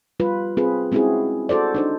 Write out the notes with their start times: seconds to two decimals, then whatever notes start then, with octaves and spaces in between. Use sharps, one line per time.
0.20 G3 F4 B4
0.57 C4 F4 G#4 B4
0.92 G#3 C4 C#4 E4 F#4 G#4
1.49 F#4 A4 C5 D5
1.75 D4 D#4 C5